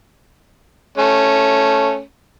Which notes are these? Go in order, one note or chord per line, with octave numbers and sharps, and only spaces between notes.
A3 C#4